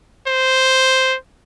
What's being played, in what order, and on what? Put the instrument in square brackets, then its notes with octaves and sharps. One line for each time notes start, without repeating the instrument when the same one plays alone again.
[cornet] C5